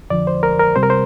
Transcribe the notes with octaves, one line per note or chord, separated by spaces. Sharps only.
F2 D3 F3 D5
C5
A#4
A#4
C3 G3 C4 C5
A#4
C5